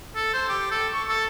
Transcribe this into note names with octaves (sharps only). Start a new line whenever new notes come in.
A4
C5
G4
A4
C#6
A4